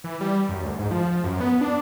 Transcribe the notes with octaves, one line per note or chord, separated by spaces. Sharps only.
E3
G3
F#2
D2
G#2
F3
F#2
B3
D4